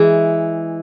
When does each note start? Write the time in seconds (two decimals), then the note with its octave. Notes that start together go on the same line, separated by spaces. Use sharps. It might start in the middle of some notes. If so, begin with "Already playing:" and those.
Already playing: E3 G#3